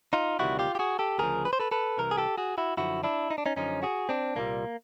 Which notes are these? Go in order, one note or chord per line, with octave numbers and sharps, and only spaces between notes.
D#4 F4
D2 C3 D#3 G3 E4 F#4
F4 G4
G4
F#4 G#4
G4 A4
D2 C#3 F3 G#4 A#4
B4
C5
A4 B4
A4 B4
C2 C3 E3 A#4
G#4
G4 A4
F#4 G#4
E4 F#4
F#2 D3 F3 E4 F#4
D4 E4
D#4
D4
C#4 D#4
F#2 D3 F3 C#4 D#4
F#4 G#4
C4 D4
C2 A#2 G3 A#3